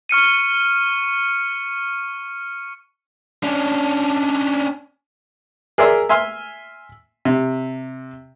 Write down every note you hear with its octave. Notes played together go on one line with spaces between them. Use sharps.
C#6 F6 C#7 D#7
C#4 D4
G#4 A#4 D5 E5 C6
E5 G#5 C6 F6
C3